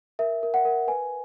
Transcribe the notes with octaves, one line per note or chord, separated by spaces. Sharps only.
A#4 E5
A#4
F#5
A#4
B4 G#5